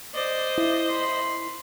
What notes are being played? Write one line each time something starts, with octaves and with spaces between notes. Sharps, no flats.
C5 D5 D#5
E4
B5 C6